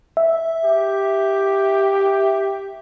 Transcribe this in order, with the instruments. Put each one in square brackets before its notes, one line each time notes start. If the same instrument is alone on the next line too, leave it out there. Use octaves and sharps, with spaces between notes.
[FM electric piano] E5
[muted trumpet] G4